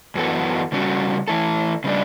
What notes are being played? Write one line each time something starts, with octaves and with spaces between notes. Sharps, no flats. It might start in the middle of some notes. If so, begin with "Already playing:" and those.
F#2 E3 B3 F#4 A4
C#3 G3 C#4 F#4
E3 A3 E4 A4
C#3 G3 D4